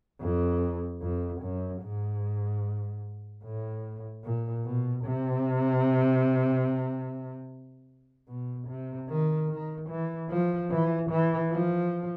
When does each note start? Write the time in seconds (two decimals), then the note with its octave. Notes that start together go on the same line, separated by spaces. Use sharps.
0.21 F2
1.02 F2
1.42 F#2
1.82 G#2
3.44 A2
4.24 A#2
4.65 B2
5.05 C3
8.28 B2
8.68 C3
9.09 D#3
9.49 D#3
9.90 E3
10.30 F3
10.71 E3
11.11 E3
11.51 F3